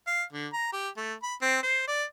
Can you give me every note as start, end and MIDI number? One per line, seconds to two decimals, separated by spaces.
0.07 0.23 77
0.33 0.48 50
0.53 0.72 82
0.73 0.89 67
0.97 1.14 57
1.23 1.35 83
1.41 1.61 60
1.63 1.86 72
1.88 2.04 74